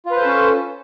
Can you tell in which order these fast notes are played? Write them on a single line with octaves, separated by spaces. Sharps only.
F4 B4 C5 A4 C#4